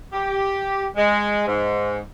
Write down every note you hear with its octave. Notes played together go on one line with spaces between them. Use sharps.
G4
G#3
G#2